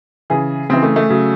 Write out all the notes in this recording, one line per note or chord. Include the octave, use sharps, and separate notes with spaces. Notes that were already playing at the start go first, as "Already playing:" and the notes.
C#3 E3 G#4
C#3 E3 C4
A3
A3
C#3 F#3